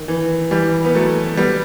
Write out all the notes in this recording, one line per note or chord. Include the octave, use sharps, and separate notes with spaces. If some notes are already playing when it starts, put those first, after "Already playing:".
Already playing: D#3
E3
E3 G3
B3
F#3 A3
G3 B3